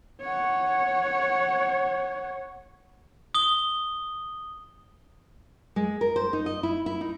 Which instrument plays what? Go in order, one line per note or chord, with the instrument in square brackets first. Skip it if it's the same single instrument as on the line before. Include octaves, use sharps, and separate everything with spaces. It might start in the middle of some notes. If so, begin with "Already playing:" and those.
[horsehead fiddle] C#5 F#5
[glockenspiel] D#6 G7
[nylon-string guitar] G#3
A#4
C5
D#4
D#5
E4
E4
D#4